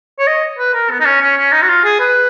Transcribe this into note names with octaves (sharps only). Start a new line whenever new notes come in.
C#5
D#5
B4
A#4
B3
D#4
C#4
C#4
C#4
D#4
F#4
F4
G#4
B4